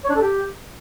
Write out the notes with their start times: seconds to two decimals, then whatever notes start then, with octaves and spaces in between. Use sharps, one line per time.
0.04 C#5
0.10 D4
0.15 A4
0.21 G4